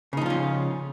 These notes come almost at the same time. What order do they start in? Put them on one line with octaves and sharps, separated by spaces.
C#3 D#4 F3 F4 C#4